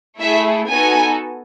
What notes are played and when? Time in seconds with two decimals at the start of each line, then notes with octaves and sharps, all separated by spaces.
0.20 A3 E4 G#4 E5
0.70 B3 D#4 F#4 A4 G#5